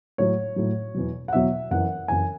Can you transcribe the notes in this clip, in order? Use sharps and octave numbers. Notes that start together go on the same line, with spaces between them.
A2 F#3 C#5
A2 F#3
E2 B2 F#3
F#5
E2 B2 F#3 E5
F#2 E3 F#5
F#2 E3 G#5